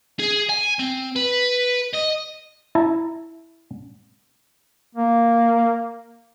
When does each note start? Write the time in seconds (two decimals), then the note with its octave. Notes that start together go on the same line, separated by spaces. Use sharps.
0.20 G#4
0.49 G#5
0.79 C4
1.16 B4
1.94 D#5
2.75 E4 A5 A#5
4.95 A#3